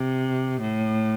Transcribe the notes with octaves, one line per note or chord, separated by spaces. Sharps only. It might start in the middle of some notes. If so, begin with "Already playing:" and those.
Already playing: C3
A2